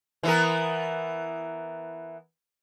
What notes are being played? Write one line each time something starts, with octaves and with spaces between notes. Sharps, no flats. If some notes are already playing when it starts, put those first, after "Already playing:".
E3 B3 A#4